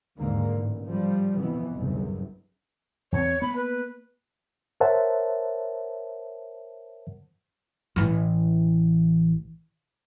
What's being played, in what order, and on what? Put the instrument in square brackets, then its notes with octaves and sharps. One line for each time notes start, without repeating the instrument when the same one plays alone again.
[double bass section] D#2 G#2 D3 A#3
A1
F3 G3
F2 B2 E3 B3
F#1 B1 E2 G2
[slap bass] E2 C4 [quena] C#5
[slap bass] A#3 B3 [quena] B5
[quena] B4
[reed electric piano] A#4 C5 C#5 E5 F#5 A5
[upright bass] A1 E3